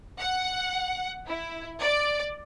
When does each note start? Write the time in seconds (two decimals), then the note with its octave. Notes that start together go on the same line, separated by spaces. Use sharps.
0.19 F#5
1.28 E4
1.80 D5